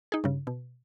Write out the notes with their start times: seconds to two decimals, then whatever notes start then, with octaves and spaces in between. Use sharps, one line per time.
0.12 D#4 G#4
0.24 G2 C#3
0.47 B2